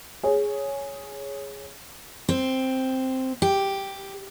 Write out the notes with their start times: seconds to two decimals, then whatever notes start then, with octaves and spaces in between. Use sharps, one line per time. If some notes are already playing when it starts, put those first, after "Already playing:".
0.23 G#4 C#5
2.29 C4
3.42 G4